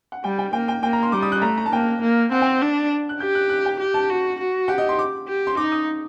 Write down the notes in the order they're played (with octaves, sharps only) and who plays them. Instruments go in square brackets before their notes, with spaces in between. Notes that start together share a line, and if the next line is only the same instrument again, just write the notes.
[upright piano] F#5
[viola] G3 [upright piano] G5
[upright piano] G5
[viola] A#3 [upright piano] G5
[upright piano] G5
[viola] A#3 [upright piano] G5
[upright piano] A#5
C6
[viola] G3 [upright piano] D6
[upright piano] D#6
F#6
[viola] A3 [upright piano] A#5
[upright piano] A#5
A5
[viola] A#3 [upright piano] G5
[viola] A#3
[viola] C4 [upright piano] F#5
[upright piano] G5
[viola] D4
[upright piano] F#6
[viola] G4 [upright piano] G6
[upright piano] F#6
F#6
G5
[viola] G4
[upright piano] A5
[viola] F#4
F#4
[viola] G4 [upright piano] F#5
[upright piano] D#5
C6
D6
[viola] G4
[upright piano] C6
[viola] D#4 [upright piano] D6
[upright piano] D#6